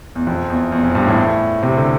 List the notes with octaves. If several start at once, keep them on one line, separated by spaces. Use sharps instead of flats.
E2
F2
E2
E2
F2
G2
A2
C3
D3